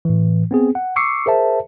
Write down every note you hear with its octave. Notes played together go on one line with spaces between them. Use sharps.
A2 E3
B3 C4 G#4
F#5
C#6 D6 E6 C7 C#7
G#4 A#4 C5 E5 A5